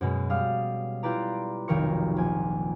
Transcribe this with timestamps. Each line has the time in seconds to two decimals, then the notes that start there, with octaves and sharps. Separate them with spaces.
0.01 F#2 B2 G#3
0.30 G3 F5 D#6 F6
1.03 E4 F4 G4 B4 D5 A#5
1.68 F1 B1 D#3 A#4 C#6 C#7
2.16 A#1 G#5